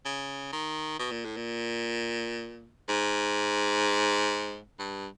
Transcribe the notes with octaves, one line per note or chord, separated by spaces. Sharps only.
C#3
D#3
B2
A#2
A2
A#2
G#2
G2